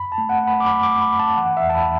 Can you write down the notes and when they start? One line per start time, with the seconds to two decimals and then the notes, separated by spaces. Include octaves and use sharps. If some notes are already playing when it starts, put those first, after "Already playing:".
Already playing: F#2 B5
0.12 A5
0.18 A3
0.29 F#5
0.42 A3
0.48 B5
0.60 D6
0.65 F#2 B5
0.83 D6
0.89 A3
1.01 B5
1.14 F#2 A5
1.37 E3 F#5
1.57 E5
1.62 E2
1.70 A5
1.75 B5